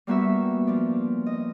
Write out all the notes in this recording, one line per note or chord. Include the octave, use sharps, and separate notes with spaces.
G3 A#3 B3 F#4 E5 E6
F3 D4
D#5